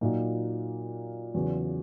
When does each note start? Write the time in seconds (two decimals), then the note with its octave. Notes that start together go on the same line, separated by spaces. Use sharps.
0.01 A#2 F#3 A#3 D#4
1.34 E2 C#3 F#3 B3